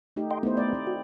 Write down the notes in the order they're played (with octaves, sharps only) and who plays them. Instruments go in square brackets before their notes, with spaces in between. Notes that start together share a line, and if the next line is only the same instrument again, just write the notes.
[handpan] A3 D#4 G4
[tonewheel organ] D#5 G5 C6
[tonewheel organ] A3 B3 [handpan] D#4 E4 C5
[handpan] D5
C4
[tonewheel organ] F#4